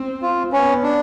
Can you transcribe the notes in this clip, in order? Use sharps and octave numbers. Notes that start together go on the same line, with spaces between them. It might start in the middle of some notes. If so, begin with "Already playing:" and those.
Already playing: C4
F4
B3 C#4
D4